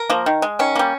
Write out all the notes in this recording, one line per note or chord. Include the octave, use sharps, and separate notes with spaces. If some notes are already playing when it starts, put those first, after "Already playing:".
Already playing: A#4
F3 A#3
D#3
G#3
D#3 C#4
G3 A#3